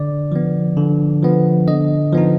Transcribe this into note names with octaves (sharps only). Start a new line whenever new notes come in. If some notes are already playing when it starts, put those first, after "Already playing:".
Already playing: D3 D5
F3 B3
D3
F3 B3
D3 D#5
F3 B3 D#4